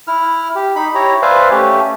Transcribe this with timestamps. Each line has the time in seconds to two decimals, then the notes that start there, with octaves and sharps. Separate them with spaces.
0.08 E4 F6
0.55 G4
0.76 D#4 B5
0.95 E4 G4 C#5 A#5
1.22 B4 C5 D5 E5 F5 G#5
1.51 A3 C#4 G4